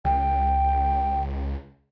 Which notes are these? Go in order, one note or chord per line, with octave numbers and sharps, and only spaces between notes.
C#2 G5